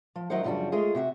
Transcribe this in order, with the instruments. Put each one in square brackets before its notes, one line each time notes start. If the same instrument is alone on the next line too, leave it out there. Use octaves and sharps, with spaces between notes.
[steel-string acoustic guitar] F3
D#3 F#3 D#4 E4 C5 F#5
F#2 C#3 F3 G3 D4 F#4
G#3 A3 F4 G#4
C3 F#4 E5